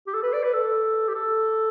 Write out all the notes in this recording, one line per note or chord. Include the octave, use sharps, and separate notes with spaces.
G4
A4
B4
D5
B4
A4
G4
A4